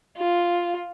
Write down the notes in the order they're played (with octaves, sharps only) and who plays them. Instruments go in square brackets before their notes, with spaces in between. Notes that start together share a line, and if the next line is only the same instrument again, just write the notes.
[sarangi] F4